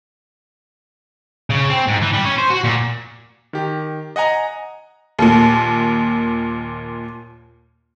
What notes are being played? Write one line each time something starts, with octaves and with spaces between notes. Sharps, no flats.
C#3
C4
G#2
E3
G3
C#4
C5
F#4
A#2
D#3 G4
D#5 F#5 G#5 A#5
D#2 A#2